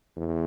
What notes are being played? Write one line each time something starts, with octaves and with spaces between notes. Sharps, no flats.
E2